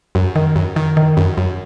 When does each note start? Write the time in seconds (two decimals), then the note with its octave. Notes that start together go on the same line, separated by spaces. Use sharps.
0.15 F#2
0.36 D#3
0.56 F#2
0.76 D#3
0.97 D#3
1.17 F#2
1.37 F#2